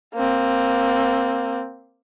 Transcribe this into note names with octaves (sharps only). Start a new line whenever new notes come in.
A#3 C4